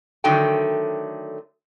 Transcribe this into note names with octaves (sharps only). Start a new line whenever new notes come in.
D3 D#3 F#3 A3 G5